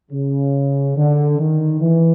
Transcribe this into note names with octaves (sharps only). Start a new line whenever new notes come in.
C#3
D3
D#3
E3